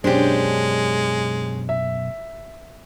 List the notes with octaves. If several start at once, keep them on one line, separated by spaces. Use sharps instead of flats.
F#2 B2 G#3 C#4 D4 G4 C5
E5